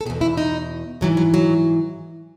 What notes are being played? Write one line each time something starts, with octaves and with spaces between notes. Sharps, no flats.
A4
E2 B2 G#4
E4
D#4
G#2 E3 F#3
F#3
F#3